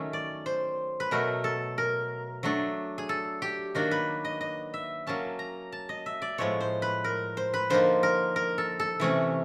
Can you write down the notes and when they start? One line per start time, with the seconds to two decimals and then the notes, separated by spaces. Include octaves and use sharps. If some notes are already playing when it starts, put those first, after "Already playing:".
Already playing: D#3 F#3 A3 C#4
0.13 D5
0.46 C5
1.00 B4
1.11 B2 F#3 A3 A#4
1.44 A4
1.78 A#4
2.43 F#3 A3 D4
2.98 G#4
3.09 A4
3.42 G4
3.75 D#3 F#3 A#3 D4 F#4
3.91 B4
4.25 D#5
4.41 D#5
4.74 E5
5.07 F#3 A#3 C#4 A5
5.39 A#5
5.72 A5
5.89 D#5
6.06 E5
6.22 D5
6.38 A2 F3 G#3 B3 C#5
6.60 C5
6.82 B4
7.04 A#4
7.37 C5
7.54 B4
7.70 D3 F3 A#3 D#4 C5
8.03 A#4
8.36 A#4
8.58 A4
8.80 A4
9.00 C3 E3 A3 C#4 C#5